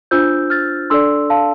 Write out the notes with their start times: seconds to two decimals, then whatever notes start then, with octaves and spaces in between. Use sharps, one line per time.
0.11 D4 F4 C5 E6 G6
0.50 F6 A6
0.90 D4 A4 D5 C6 E6
1.30 F5 A5